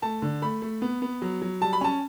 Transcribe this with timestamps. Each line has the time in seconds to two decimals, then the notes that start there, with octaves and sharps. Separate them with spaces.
0.02 A3 A5
0.22 D3
0.42 A3 B5
0.62 A3
0.82 B3
1.02 B3
1.22 F#3
1.42 F#3
1.61 G3 A5
1.73 B5
1.81 C#4 A5